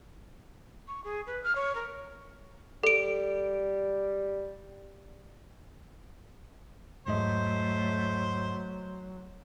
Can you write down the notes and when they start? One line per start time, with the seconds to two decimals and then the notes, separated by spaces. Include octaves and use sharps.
0.88 C#6
1.04 G#4
1.27 B4
1.44 F6
1.55 C#5
1.75 A#4
2.83 G3 A4 D7
7.07 E2 G#2 F#3 A3 C5 D#5